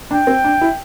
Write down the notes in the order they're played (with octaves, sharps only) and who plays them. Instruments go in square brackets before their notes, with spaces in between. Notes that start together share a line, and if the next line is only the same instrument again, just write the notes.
[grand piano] D4 [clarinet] G5
[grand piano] C4
D4
E4